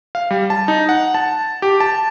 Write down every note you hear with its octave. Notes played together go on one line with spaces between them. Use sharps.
F5
G3
A5
D#4
F#5
A5
G4
A5